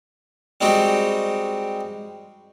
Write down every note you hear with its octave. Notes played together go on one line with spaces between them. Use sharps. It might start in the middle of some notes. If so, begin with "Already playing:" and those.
G3 G#3 C4 D#4 F#4 G4